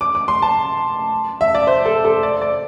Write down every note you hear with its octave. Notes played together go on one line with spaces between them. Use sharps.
D6
D6
C6
A5
E5
D5
C5
A4
A4
D5
D5